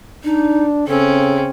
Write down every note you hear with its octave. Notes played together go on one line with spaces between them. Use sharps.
D4 D#4
C#3 C4 C#4 A4